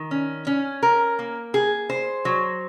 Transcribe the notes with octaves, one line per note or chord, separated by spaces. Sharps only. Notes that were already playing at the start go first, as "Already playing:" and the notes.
Already playing: D#3
C#4
C#4
A#4
A#3
G#4
C5
F#3